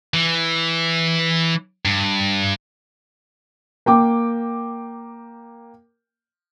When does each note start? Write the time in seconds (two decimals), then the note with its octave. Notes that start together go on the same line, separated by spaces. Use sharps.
0.14 E3
1.85 G2
3.86 A#3 G5 D6